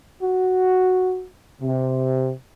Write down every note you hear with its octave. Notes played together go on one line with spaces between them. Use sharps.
F#4
C3